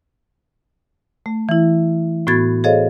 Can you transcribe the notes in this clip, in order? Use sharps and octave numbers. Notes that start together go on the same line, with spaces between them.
A3
E3 E4
A2 B3 F#4 B5 G#6 A6
G#4 A4 C5 C#5 D#5 F5